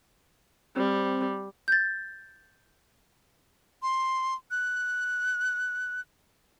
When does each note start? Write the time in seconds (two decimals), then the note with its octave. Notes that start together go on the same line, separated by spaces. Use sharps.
0.76 G3 C4
1.68 G6 A6
3.82 C6
4.51 F#6